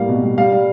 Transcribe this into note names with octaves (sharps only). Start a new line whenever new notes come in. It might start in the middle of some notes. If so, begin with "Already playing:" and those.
Already playing: A2 G3 A#3 F5
B2
G3
G3 F5
G3